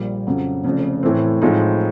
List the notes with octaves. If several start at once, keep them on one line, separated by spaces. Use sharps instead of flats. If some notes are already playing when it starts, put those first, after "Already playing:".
Already playing: A#1 A#2 G3
F2 C#3 F#3
F1 F2 C#3
A2 E3 A3 C4
A2 F3 G#3 C4 D#4